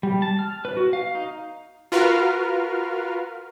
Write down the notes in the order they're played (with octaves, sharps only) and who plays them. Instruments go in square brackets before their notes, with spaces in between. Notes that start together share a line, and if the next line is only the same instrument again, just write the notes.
[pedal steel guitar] G3
A5
F6
B4
F#4
F5
D#4
[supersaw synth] F4 F#4 A#4 B4 F5 F6